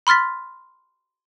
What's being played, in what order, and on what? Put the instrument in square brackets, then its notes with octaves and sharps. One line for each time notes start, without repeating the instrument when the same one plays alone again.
[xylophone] B5 C6 F6 A6 B6